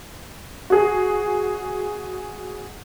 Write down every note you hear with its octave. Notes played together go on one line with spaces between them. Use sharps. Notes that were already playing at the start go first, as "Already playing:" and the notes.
F#4 G#4